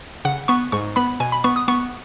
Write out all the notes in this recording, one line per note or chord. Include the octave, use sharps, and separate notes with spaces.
C#3 F#5
B3 C#6
G#2 C#6
B3 B5
B2 G#5
B5
B3 C#6
D#6
B3 C#6